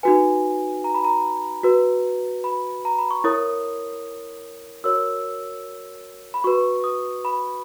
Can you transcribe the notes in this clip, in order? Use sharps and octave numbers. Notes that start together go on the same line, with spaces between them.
D#4 F#4 B4 G#5
A#5
B5
A#5
F#4 B4
B5
A#5
B5
C#6
E4 A#4 C#5 D#6
F#4 A#4 C#5 E6
B5
F#4 B4 C#6
D#6
B5